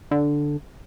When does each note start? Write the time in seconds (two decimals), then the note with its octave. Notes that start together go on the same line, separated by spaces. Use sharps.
0.11 D3